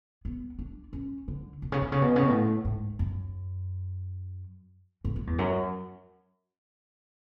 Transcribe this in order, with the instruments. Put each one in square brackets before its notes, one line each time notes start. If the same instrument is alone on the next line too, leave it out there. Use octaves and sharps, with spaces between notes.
[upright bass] B3
D4
C#4
D3
B2
C#3
B2
C#3
B2
C#3
B2
A2
G#2
F#2
G#2
F#2
E2
F#2